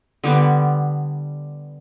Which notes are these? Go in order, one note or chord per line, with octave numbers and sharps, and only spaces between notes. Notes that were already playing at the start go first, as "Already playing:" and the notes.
D3 G3 B3